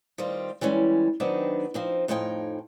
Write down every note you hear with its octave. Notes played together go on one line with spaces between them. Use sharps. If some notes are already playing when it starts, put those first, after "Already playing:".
D#3 G3 C4 F4
E3 G3 G#3 C#4
D#3 F#3 B3 C4 D4 D#4
F3 C4 D#4
F2 A2 F3 D#4 G5 G#5